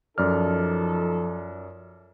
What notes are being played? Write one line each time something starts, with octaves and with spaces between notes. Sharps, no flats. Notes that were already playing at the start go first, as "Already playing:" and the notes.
F#2 F3 D#4 A4 D5 F6